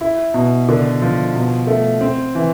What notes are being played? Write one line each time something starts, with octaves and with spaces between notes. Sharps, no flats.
E4
B2
D3
F3
B2
A3
C4
E3